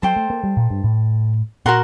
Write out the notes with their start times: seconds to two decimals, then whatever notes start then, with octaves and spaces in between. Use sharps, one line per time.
0.02 F#3 A4 C5 G5 C6
0.16 A3
0.30 A#3
0.44 G3
0.57 A#2
0.70 G2
0.84 A2
1.65 A#2 F#4 A#4 F#5 C6